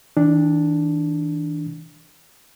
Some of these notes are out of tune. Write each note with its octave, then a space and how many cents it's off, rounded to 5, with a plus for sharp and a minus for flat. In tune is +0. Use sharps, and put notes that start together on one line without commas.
E3 -45 D4 +0